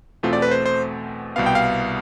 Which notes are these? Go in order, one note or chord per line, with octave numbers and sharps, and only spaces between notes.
E2 B2 A3 C4 F4
D5
B4
C5
C5
C2 B2 B3 F5
G5
F5